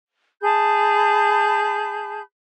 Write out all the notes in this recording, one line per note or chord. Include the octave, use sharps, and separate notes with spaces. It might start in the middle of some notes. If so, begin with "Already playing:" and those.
G#4 A5 B5 G6